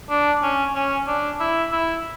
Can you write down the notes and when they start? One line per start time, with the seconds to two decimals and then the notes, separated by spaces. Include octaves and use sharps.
0.10 D4
0.42 C#4
0.75 C#4
1.07 D4
1.40 E4
1.72 E4